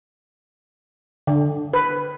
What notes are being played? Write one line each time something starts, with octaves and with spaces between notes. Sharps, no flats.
D3
B4